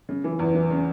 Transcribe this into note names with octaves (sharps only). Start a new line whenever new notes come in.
C#3
E3
E2
E3
C#3